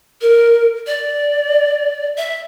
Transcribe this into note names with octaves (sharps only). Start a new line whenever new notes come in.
A#4
D5
E5